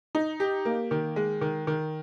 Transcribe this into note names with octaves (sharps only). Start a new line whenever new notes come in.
D#4
G4
A#3
D#3
G#3
D#3
D#3